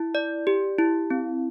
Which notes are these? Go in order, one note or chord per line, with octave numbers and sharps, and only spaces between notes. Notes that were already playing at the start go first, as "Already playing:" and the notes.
Already playing: E4
D5
G4
E4
C4